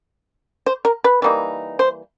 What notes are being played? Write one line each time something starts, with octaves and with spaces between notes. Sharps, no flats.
C5
A#4
B4
E3 G3 A#3 D#4
C5